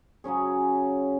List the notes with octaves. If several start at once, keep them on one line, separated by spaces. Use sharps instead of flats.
C#3 F#3 C#4 G#4